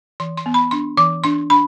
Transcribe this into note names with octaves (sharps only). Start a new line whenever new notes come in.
E3 C6
C6
B3
B5
D4 C6
E3 D6
D4 C6
D4 B5